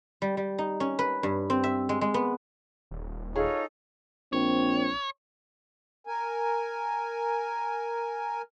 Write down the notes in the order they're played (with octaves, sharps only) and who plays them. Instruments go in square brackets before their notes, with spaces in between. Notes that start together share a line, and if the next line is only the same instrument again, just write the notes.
[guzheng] G3
G3
D#4
C#4
B4
G2
C4
E5
G#3
G#3
B3
[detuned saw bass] D#1
[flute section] D#4 F4 A4 [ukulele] G#4 [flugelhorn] C#5
[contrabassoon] A#1 [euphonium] C4 [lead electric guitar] C#5
[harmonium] A#4 G#5